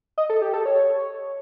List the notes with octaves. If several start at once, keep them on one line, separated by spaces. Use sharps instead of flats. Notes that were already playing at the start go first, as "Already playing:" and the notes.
D#5
A4
G4
A4
C#5